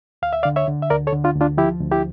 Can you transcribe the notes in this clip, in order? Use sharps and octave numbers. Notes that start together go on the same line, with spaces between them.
D2 F5
E5
D3 D5 F5
C#5 E5
D3
E5
D2 A#4 D5
A4 C#5
D3
D4 F4
D2
D4 F4
F3 E4 G4
D2
E4 G4